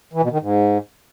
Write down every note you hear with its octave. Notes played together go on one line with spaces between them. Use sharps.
E3
B2
D#3
G#2